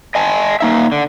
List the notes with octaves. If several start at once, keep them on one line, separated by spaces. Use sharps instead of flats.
D#5 G#5 A5
A#3 D#4 E5
D3